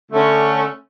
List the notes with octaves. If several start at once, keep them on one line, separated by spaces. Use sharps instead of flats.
D3 A3 C#4